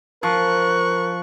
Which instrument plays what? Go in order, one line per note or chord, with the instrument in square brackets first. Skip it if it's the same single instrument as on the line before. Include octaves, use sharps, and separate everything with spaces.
[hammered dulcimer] F3 [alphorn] A#4 [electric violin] C#6 F#6